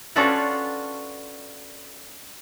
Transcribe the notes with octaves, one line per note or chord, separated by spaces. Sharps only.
C#4 D4 F4 F#4 A4 B4